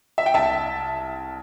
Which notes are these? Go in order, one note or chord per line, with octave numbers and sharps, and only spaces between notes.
E5
G5
C2 E5 A5